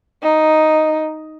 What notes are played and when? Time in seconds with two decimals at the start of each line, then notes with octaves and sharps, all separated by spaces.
0.23 D#4